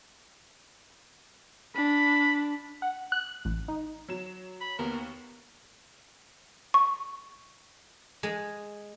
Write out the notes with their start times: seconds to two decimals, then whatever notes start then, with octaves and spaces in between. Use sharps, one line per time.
1.76 D4 B5
2.82 F#5
3.12 F#6
3.45 A1
3.68 D#4
4.09 F#3 E7
4.61 B5
4.79 D#2 B3 A#4
6.74 C#6
8.23 G#3